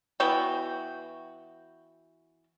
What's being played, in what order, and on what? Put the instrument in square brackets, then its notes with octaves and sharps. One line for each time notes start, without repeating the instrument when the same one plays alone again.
[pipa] E3 B3 F#4 G5